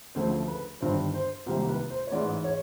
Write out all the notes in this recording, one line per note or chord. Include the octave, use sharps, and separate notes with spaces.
D2 C#3 F3 A3 C5
B4
G1 G2 D#3 C5
C5
C2 C3 D#3 G3 A#3 C5
B4
C5
C#5
A1 G#2 E3 G#3 D5
C#5